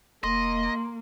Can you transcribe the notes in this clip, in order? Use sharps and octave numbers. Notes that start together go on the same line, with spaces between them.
E1 A#3 D#5 C6